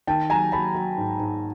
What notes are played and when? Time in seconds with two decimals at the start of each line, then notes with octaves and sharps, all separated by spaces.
0.07 D#3 G5 A5
0.30 F#3 G#5 A#5
0.52 F#3 A5 B5
0.75 F#3
0.98 G#2
1.20 G#2